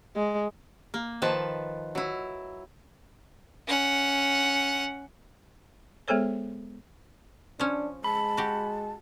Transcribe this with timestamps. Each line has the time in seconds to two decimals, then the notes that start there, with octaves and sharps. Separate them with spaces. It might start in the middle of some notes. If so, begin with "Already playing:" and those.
0.16 G#3
0.94 A#3
1.22 D#3 F3 B4 A5
1.95 F#3 E4
3.67 C#4 F#5
6.08 G#3 B3 G#4 A4 C5 C#5
7.60 F3 C#4 D4
8.04 G#3 A5 B5
8.37 F#4 G4